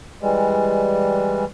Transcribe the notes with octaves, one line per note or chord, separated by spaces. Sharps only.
E3 G3 G#3